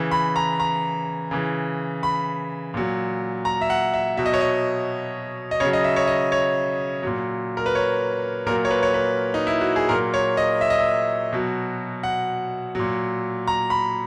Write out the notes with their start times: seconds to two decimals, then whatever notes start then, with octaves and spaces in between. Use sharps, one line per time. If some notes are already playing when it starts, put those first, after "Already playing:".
Already playing: C#3 E3
0.11 B5
0.36 A#5
0.60 A#5
1.31 C#3 E3
2.03 B5
2.74 A#2 F#3
3.45 A#5
3.61 E5
3.70 F#5
3.94 E5
4.17 B2 F#3 E5
4.26 D#5
4.34 C#5
4.41 D#5
5.51 D#5
5.60 C#3 F#3 C#5
5.73 D#5
5.84 E5
5.96 C#5
6.07 D#5
6.32 C#5
7.03 A#2 F#3
7.57 A#4
7.66 B4
7.75 C#5
8.46 A#2 F#3 A#4
8.65 C#5
8.71 B4
8.83 C#5
8.94 B4
9.34 D#4
9.47 E4
9.61 F#4
9.76 G#4
9.89 A#2 F#3 A#4
10.14 C#5
10.37 D#5
10.61 E5
10.70 D#5
10.79 E5
11.33 B2 F#3
12.03 F#5
12.75 A#2 F#3
13.48 A#5
13.70 B5